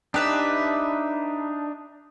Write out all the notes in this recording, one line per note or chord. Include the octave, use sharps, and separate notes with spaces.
D4 D#4 G4 B4 E5